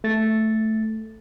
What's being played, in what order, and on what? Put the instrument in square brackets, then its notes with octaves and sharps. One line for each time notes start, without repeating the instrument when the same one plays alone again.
[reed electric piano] A3 A6